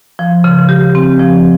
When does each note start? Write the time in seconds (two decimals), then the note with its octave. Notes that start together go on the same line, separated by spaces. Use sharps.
0.19 F3
0.44 C#3
0.69 G4
0.95 C4
1.20 F3